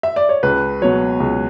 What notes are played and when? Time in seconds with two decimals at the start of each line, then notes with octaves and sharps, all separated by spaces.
0.03 E5
0.16 D5
0.29 C#5
0.43 C#2 B4
0.82 B2 F#3 C#5
1.20 C#2